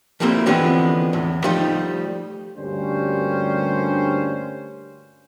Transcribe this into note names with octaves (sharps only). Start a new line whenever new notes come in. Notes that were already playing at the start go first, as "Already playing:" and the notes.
F3 G3 A3 A#3 C4 E4
D3 E3 F3 G#3 B3 C4
E2 A2
F3 G3 A3 D#4
D2 G2 G3 A#3 C#4 C5